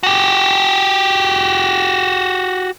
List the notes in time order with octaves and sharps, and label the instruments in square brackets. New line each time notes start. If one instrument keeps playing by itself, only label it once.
[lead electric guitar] F#4 G4